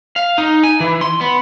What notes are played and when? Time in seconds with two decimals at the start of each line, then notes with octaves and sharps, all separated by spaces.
0.16 F5
0.38 D#4
0.63 G#5
0.80 E3
1.01 C6
1.21 B3